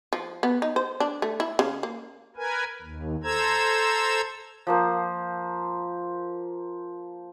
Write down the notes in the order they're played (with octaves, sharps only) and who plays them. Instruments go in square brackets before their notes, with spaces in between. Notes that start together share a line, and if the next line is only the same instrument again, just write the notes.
[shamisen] F3
B3
D#4
C5
D4
A3
E4
C#3
A#3
[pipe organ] A#4 B4 G#5
D#2
A4 C5 A#5 E6 G#6
[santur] F3 A#3 C5